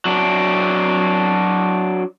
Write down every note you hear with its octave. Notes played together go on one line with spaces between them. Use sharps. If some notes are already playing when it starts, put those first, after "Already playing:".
F#3 D4